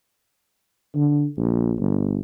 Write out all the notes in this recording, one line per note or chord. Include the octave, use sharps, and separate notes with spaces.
D3
A#1
G1